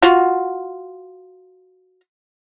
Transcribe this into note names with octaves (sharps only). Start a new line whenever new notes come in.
F4 F#4